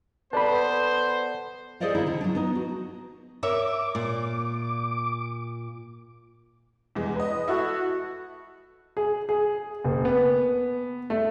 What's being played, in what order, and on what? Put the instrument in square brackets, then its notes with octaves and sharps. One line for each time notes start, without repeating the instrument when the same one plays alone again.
[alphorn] B3 [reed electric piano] A4 D5 A5 [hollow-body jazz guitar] B4 B5 [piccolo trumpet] C5
[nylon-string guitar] G#4 A4 C5 D5 D#5 F5
D#3 E4
D3
F#3 D4
B3 D#4
F#4
[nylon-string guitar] A#4 C#5 E5 [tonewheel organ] D6
[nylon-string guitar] A#2
[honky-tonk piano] E2 G#3
B4 D#5
[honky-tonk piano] E4 A4 [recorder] F#4
[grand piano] G#4
G#4
F#1
B3
A3